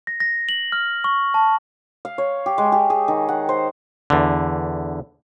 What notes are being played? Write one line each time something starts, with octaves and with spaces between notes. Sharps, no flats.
A#6
A#6
F#7
F6
C#6
A5
F5
C#5
G4
G#3
G4
G#4
D#3
F#5
C5
E2 D3